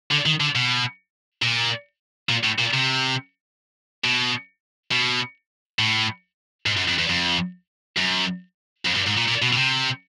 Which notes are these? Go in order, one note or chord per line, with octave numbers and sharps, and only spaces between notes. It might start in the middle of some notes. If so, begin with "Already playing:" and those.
D3
D#3
D3
B2
A#2
A#2
A2
A#2
C3
B2
B2
A2
G#2
F#2
F2
E2
F2
F#2
F2
G2
G#2
A#2
A#2
B2
B2
C3